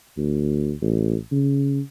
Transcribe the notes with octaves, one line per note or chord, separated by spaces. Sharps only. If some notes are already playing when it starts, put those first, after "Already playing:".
D2
A1
C#3